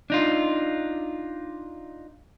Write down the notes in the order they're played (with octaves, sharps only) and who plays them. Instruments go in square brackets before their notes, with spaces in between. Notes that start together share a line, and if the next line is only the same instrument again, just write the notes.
[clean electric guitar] D4 D#4 F4